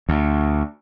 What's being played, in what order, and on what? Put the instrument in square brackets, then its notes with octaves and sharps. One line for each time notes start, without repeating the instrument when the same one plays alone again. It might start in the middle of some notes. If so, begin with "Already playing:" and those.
[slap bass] D2